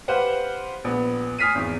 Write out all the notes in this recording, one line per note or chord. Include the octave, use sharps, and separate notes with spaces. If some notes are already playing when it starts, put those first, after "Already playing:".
G4 B4 C5 F5 F#5
A#1 B3
G#5 D#6 F6 B6 C7 D#7
G#1 E2